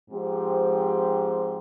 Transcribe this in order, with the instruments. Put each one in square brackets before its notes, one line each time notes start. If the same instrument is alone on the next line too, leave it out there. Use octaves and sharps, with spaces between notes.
[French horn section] G#2 F3 C4 G4